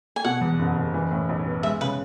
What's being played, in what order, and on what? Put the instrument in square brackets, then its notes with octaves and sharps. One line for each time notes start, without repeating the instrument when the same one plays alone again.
[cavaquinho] G#5
[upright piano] B2 [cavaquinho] F#5
[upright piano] E2
F#1
F#1
E3
A2
B1
B3
[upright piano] G#3 [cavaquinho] E5
[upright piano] C#3 [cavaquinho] B4